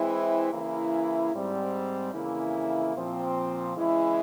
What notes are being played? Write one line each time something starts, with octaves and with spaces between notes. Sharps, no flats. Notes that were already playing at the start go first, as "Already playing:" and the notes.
Already playing: E3 G#3 C4 E4
C#3 E3 A#3 E4
G#2 G3 C4
F2 C#3 E3 A#3 E4
A#2 F3 C4
C#3 E3 G#3 E4